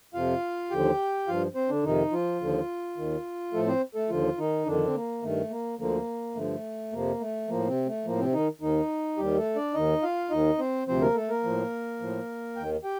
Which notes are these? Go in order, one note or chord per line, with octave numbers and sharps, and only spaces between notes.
F2 C3 F3 F4 F5
D#2 D3 F3 G4 G5
G2 F3 F4 F5
C4 C5
D3 D4
F2 C3 D#3 D#4
F3 F4
D#2 D3 F3
D#2 D#3
A2 F3 A3 A4
C4 C5
A3 A4
D#2 D3 F3 F4
D#3 D#4
F2 D3 D#3 D4
C4
A#3
G2 D#3 A3
A#3
D2 D3 F3 A#3
G2 D3 F3 A3
F2 C3 F3 A#3
A3
A2 F3 A#3
C3 C4
A3
A2 F3 A#3
C3 C4
D#3 D#4
D#2 D#3 D#4
D#2 D#3 G3 G4
A3 A4
D4 D5
D#2 D#3 D#4 D#5
F4 F5
D#2 D#3 D#4 D#5
C4 C5
D2 C3 F3 C4 C5
A#3 A#4
A3 A4
A#3 A#4
A2 F3
A2 F3
D#2 D#3 G5
G4 G5